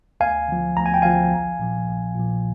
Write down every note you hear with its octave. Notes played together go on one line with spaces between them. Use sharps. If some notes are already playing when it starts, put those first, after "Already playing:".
D2 F5 G#5
D3 F3
D2 A#5
G#5
G5
D3 F3 F5 G#5
A#1
A#2 F3
A#1
A#2 F3